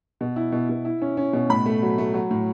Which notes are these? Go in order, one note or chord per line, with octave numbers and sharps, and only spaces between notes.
B2
E4
B2
B2
E4
C#4
C#4
B2
A2 B5
A3
F#3
A3
F#3
A2